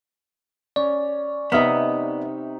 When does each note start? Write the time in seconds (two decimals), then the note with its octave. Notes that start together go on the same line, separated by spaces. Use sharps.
0.76 C#4 D5
1.52 C3 B3 D#4 E5 D#6 F6